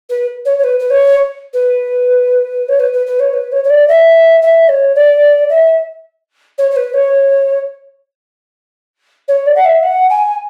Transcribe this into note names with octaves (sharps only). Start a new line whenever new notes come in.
B4
C#5
C#5
B4
B4
C#5
B4
C#5
B4
B4
B4
C#5
B4
C#5
C#5
D5
E5
E5
C#5
D5
E5
C#5
C#5
B4
C#5
C#5
D5
F#5
E5
F#5
G#5